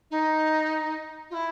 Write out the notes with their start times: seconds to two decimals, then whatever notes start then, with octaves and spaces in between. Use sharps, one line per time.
0.11 D#4
1.30 F4
1.34 E4